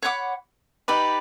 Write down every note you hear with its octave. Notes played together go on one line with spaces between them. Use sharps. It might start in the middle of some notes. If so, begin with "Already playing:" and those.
C#5 F#5 B5 D6
D#4 G4 B4 D5